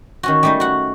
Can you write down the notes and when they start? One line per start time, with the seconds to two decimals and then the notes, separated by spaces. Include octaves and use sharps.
0.23 D#3 C#4 F#4
0.43 G3 A3 D#4
0.60 F#4 F#5